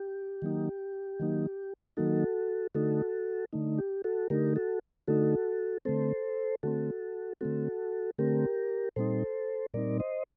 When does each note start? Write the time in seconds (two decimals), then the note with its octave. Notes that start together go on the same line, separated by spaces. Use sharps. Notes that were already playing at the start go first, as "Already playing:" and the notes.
Already playing: G4
0.42 D#3 F#3 A#3 D#4
1.19 D#3 F#3 A#3 D#4
1.97 D#3 F#3 A#3 D#4 F#4 A4
2.75 D3 A3 D#4 F#4 A4
3.53 D3 A3 D#4
3.78 G4
4.04 F#4 A4
4.30 D3 A3 D#4 G4 A#4
4.56 F#4 A4
5.08 D3 A3 D#4 F#4 A4
5.85 D3 A3 C4 A4 C5
6.63 D3 A3 C4 F#4 A4
7.41 D3 A3 C4 F#4 A4
8.18 D3 A3 C4 G4 A#4
8.96 A#2 G3 C4 D#4 A4 C5
9.74 A#2 G3 C4 D#4 A#4 D5
10.00 C5 D#5